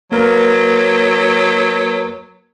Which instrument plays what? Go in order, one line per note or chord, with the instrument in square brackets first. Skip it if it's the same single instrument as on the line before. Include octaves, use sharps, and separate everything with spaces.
[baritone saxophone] F#3 [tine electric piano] A#3 A#4 B4